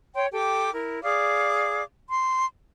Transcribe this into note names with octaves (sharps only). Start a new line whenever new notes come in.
C#5 G5 C6
G4 A4 G5 D6
E4 A#4
G#4 D5 F5 D6
C6